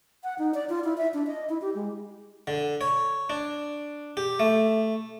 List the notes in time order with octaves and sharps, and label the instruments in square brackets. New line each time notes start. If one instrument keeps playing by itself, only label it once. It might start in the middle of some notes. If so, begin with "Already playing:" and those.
[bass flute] F#5
D#4
D5
F4
E4
E5
D4
D#5
E4
G4
G#3
[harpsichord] D3
C#5
D4
G4
A3